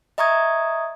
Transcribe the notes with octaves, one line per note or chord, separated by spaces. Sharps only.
D#5 E5 A#5 C#6 D#6 G#6